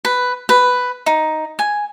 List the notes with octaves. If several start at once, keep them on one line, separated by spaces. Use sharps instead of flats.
B4
B4
D#4
G#5